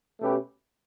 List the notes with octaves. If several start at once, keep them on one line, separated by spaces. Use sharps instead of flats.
B2 A3 C#4 G4 B4